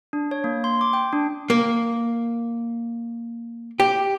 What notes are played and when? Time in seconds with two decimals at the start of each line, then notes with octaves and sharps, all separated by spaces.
0.13 D4
0.31 C#5
0.44 A#3
0.64 C6
0.81 D6
0.93 G5
1.13 D4
1.50 A#3
3.80 G4